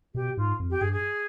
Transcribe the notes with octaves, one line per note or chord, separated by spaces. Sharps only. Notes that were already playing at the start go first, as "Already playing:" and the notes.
B2 G4
G#2 F4
F2
G4
G2 G#4
G#4